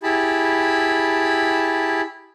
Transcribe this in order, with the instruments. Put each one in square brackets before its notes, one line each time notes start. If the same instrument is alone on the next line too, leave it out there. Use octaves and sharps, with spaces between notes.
[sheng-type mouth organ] E4 G4 G#4 A5 B5